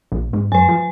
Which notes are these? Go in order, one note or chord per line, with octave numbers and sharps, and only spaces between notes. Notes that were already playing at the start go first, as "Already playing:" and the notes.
A#1
G#2
F#2 B4 G#5
F3